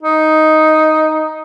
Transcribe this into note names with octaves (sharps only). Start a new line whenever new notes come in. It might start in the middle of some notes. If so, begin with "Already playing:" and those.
D#4